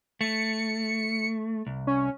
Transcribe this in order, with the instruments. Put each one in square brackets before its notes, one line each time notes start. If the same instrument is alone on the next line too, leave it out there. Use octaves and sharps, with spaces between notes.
[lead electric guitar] A3 [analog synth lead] C#7
[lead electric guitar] C2
[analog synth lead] C#4